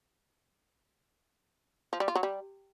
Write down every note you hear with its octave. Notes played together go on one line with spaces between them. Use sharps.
F3
G3
F4
F#3
G3